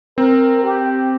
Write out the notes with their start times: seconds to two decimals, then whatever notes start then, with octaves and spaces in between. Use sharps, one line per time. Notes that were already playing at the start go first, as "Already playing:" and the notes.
0.17 C4 A#4
0.63 G4